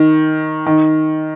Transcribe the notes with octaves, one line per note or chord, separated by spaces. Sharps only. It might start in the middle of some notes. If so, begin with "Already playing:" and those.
Already playing: D#3
D#3